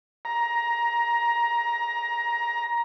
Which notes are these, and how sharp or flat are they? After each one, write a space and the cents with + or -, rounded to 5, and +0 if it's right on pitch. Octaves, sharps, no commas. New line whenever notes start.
A#5 +15